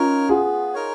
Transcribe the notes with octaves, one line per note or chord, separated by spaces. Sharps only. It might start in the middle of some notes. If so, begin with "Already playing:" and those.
Already playing: C#4 D#4 F4 A#4 C#5
B3 F4 G#4
D#4 A#4 C#5